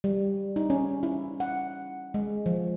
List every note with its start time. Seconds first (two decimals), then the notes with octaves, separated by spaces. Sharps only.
0.04 G3
0.56 D#4
0.70 C#4
1.03 E4
1.40 F#5
2.14 G#3
2.46 F3